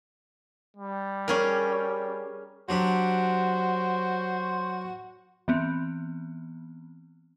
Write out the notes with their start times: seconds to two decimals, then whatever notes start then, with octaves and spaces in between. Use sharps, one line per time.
0.77 G3
1.28 C#4 G#4 A#4
2.69 F#3 D4 F#4 G4 C5
5.48 E3 B3 C4